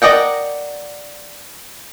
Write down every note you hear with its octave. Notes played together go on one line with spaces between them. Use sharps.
A#4 D5 D#5 F#5 G5